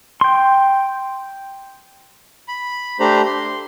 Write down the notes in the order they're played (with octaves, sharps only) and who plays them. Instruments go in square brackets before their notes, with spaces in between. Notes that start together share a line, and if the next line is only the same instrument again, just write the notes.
[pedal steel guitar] G5 C6
[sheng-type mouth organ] B5
A3 D4 G4 C5 A#5 B5
C6